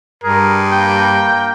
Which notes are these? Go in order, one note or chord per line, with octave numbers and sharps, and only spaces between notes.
G2 G#4 A#4
A#3 G5